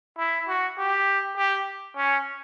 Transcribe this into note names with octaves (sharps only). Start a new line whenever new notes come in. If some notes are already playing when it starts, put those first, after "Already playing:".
E4
F#4
G4
G4
C#4